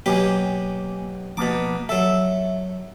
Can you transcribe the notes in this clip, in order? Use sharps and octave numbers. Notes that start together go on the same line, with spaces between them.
B2 F#3 A#3 G4 G#5
B2 F3 A#3 B3 D6
F#3 A4 E5